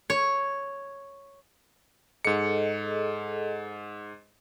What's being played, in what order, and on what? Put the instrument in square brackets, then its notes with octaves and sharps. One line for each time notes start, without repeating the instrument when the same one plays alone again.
[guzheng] C#5
[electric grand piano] G#2 C#7 [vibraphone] G#4 A4 D#5